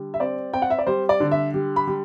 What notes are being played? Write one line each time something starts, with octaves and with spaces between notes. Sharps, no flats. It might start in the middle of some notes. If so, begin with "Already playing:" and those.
Already playing: D3 G3
E5
C4 D5
C4 G5
F#5
E5
D5
G3 C5
D5
D3
E5
G3
B5
G3